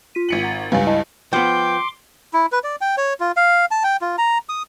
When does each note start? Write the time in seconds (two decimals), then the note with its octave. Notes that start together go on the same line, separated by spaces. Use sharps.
0.15 F4 B6 D#7
0.29 G#1 C#7 F#7
0.43 F#5 A#5 A6
0.72 C#2 G2 B4 F5 G#5
0.86 E4 D#5 A5
1.33 F3 B3 G5 C6 D6
2.34 E4
2.52 B4
2.64 D5
2.81 G5
2.98 C#5
3.20 F4
3.37 F5
3.71 A5
3.84 G5
4.01 F4
4.18 A#5
4.49 D#6